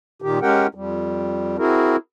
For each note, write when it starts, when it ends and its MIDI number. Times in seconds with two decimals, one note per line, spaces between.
0.22 0.39 46
0.22 0.39 51
0.22 0.39 67
0.42 0.67 56
0.42 0.67 61
0.42 0.67 67
0.42 0.67 70
0.42 0.67 78
0.42 0.67 79
0.75 1.57 41
0.75 1.57 55
1.58 1.96 60
1.58 1.96 64
1.58 1.96 66
1.58 1.96 68
1.58 1.96 70